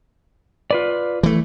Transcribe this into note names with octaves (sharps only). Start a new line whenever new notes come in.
F4 B4 D5
E3 A3